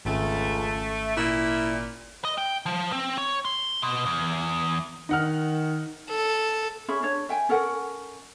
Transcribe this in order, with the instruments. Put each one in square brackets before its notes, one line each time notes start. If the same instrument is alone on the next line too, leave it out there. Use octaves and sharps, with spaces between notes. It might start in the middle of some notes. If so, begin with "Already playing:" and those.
[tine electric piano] G#1 C#4 [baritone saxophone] C#2 [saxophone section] A3
[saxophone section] A#2 [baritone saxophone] E4
[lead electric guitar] D#5
G5
F3
C4
C#5
C6
B2
E2
[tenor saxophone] D#3 [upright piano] D#4 F#5 F6
[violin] A4
[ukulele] C#4 G#4 E5 B5
D4 C#5
E5 G5 G#5
C#4 A4 A#4 F#5